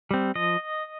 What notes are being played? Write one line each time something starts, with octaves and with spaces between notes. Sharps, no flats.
G3 C4
F3 D#5